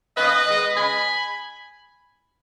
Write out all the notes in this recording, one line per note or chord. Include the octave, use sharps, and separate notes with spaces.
D#3 A#3 C#4 B4 D#5
D#3 G#3 B3
C#3 G#3 C#4 G#5 B5